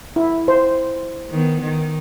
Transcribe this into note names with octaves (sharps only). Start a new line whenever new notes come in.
E4
C5
D#3 B3
D#3